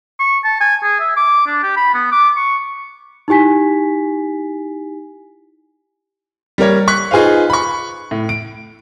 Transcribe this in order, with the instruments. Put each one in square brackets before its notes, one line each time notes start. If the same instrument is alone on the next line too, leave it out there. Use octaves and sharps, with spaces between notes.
[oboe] C#6
A5
G#5
G#4
E5
D6
D4
G4
B5
B3
D6
C#6
[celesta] D#4 E4 G4 G#5 B6
[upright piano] G3 A#3 A#4 C#5
C#6 F#6 B6
D#4 F4 G#4 B4 C5 F5
B5 C#6
A2
D7